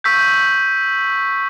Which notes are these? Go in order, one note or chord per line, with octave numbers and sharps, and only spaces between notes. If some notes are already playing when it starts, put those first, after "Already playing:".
C#6 E6 G6 B6